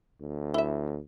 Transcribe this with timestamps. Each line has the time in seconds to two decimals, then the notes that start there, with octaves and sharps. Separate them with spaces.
0.21 D2
0.54 E4 E5